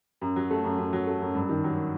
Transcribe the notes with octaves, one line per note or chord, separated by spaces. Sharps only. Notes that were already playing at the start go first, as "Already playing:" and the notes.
F#2
F#3
A3
F#2
F#2
F#3
A3
F#2
G2
D#3
F#3